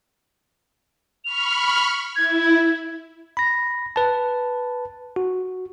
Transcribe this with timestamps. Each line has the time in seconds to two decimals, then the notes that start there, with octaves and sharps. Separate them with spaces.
1.25 B5 C#6 F6 F7
2.16 E4 G#6
3.37 B5 A#6
3.96 B4 A5
5.16 F#4